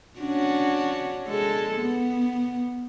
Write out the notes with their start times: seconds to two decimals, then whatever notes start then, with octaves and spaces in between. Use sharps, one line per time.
0.20 C#4 D4 F#4
1.27 G#3 A4
1.81 B3